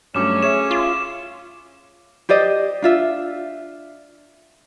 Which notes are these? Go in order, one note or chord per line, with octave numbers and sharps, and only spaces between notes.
G2 F#3 A3 C#4 D6 E7
G#4 C#5 E5 E7
F4
G4 C5 D5 D#5
D4 F4 E5